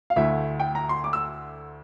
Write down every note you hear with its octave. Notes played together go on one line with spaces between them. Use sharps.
F5
D2 D3 A3 E4 E5
G5
A#5
C6
D6
E6